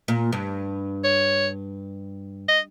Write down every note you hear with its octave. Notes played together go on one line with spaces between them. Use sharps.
A#2
G2
C#5
D#5